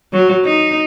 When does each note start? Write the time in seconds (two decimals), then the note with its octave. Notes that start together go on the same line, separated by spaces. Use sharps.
0.13 F#3
0.45 D#4